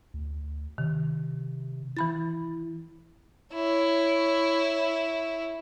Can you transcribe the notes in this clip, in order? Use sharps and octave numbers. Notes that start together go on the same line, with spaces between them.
D2
C3 D#3
E3 E4 B5 A6
E4 C#5